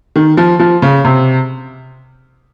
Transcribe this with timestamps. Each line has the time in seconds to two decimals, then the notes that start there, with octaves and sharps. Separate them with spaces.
0.16 D#3
0.37 F3
0.59 F3
0.82 C#3
1.04 C3